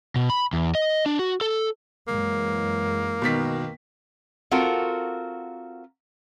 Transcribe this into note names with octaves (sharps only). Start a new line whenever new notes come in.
B2
B5
E2
D#5
D4
F#4
A4
F#2 E3 G#3 A#3
B2 D#3 B6
C4 F4 F#4 A4 A#4